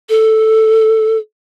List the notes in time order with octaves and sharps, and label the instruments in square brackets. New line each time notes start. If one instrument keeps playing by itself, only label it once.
[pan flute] A4